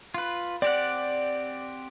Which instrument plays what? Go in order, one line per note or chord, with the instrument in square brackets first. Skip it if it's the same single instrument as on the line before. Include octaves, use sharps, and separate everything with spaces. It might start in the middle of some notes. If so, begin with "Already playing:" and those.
[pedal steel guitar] F4 B4
[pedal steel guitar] C4 G4 F#5 [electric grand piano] D5